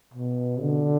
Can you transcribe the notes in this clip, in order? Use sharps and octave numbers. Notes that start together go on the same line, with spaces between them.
B2
D3